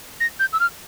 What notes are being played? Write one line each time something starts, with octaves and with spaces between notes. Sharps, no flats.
A#6
G6
E6
F6